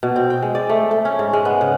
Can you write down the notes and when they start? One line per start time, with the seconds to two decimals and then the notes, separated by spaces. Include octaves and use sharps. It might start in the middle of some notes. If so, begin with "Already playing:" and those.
0.03 B2
0.16 C4
0.30 G5
0.42 G#3
0.55 D5
0.69 A3
0.91 A3
1.05 C#4
1.19 G#2
1.33 G#3
1.45 B3
1.61 C#3